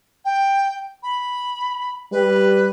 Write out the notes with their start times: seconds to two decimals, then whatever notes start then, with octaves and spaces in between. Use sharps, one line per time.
0.25 G5
1.03 B5
2.12 G3 B4